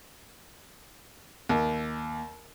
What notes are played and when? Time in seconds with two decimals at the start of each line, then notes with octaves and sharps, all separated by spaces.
1.49 D#2